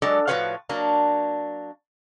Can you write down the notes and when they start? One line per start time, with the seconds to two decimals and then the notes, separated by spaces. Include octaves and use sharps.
0.02 F#3 G#3 D4 A4 D5
0.27 A2 F3 F#4 B4 C#5 F5
0.69 F#3 A#3 D4